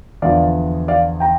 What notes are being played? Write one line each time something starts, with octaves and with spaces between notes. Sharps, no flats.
E2 D3 F3 D5 F5
D5 F5
G5 A#5